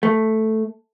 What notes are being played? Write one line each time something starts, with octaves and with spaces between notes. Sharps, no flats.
A3